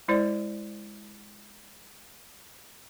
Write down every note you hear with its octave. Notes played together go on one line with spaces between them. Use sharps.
G#3 E4 C5 D5